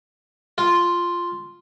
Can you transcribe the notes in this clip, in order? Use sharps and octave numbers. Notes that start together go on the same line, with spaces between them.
F4